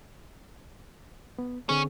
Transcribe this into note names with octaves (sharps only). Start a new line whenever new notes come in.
B3
D3 C4 C#4 G#4